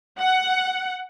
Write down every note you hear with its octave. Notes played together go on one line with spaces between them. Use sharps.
F#5